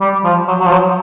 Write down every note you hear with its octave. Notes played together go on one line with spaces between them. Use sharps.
G3
F3
F#3
F#3
F3
F#3